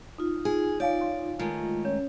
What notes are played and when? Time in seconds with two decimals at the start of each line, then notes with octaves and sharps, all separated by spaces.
0.18 D#4 F4
0.45 G#4 G#5
0.80 C#5 D5 F5 G#5
1.01 C6
1.39 D#3 G#3 A3 F4
1.85 C#4 C#5